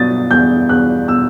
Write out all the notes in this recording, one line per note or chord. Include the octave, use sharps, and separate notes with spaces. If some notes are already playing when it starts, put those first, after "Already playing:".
Already playing: B2 F#3 D#6 A6
E2 G6
E2 F#6
B2 E6